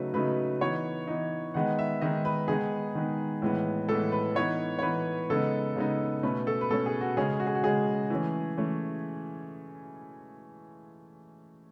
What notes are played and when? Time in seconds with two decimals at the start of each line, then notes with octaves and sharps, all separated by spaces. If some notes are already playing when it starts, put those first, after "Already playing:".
Already playing: C#3 F#3 A3 D#4 B4
0.14 C#3 F#3 A3 D#4 B4
0.61 E3 B3 D#4 C#5
1.07 E3 B3 D#4
1.54 D#3 G#3 B3 D#4 F#5
1.79 E5
2.01 D#3 G#3 B3 D#4 D#5
2.25 B4
2.48 D#3 G#3 B3 D#4 G#4
2.95 D#3 G#3 B3 D#4
3.42 A2 E3 G#3 B3
3.89 A2 E3 G#3 B3 A4
4.12 B4
4.35 E3 B3 D#4 C#5
4.79 C#5
4.82 E3 B3 D#4 B4
5.30 C#3 G#3 B3 D#4 A4
5.76 C#3 G#3 B3 D#4
6.23 B2 A3 C#4 B4
6.47 A4
6.61 B4
6.70 B2 A3 C#4 A4
6.86 G#4
7.01 F#4
7.17 C#3 G#3 C#4 G#4
7.40 F#4
7.47 G#4
7.55 F#4
7.63 C#3 G#3 C#4 G#4
8.10 E3 A3 C#4
8.58 E3 A3 C#4